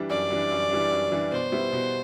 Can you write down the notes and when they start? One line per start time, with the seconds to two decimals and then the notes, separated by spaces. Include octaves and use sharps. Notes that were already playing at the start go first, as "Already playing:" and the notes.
Already playing: E3 G3 D4
0.10 F#2 D5
0.30 E3 G3 D4
0.51 F#2
0.71 E3 G3 D4
0.91 F#2
1.12 E3 G3 D4
1.32 B2 C5
1.52 G3 B3 E4
1.72 B2